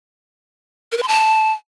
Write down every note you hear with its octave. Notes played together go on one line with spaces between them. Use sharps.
A#4
B4
C6
A5